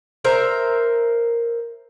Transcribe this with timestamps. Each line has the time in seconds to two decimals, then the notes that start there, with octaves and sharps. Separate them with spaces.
0.25 A#4 C5 E5 A#5